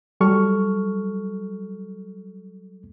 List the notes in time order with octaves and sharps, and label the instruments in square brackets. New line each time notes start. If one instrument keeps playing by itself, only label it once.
[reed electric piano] F#3 G3 A4 C#6 F6